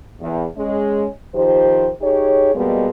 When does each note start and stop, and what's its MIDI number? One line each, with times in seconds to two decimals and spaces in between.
0.21 0.44 40
0.56 1.05 56
0.56 1.05 61
1.34 1.90 51
1.34 1.90 53
1.34 1.90 67
1.34 1.90 72
2.02 2.51 63
2.02 2.51 67
2.02 2.51 68
2.02 2.51 73
2.54 2.88 47
2.54 2.88 55
2.54 2.88 56
2.54 2.88 58
2.54 2.88 59